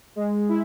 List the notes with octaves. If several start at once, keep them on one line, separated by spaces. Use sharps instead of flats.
G#3
E4